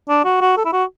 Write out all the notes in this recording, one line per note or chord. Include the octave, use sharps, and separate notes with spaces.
D4
F#4
F#4
A4
E4
F#4